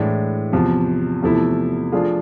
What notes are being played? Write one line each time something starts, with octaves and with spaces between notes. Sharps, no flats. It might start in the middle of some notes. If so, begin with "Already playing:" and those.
Already playing: A2 E3 G#3 D4
E2 C3 F3
E2 C3 F3 A3 E4
F3 A3 D4 F4 G#4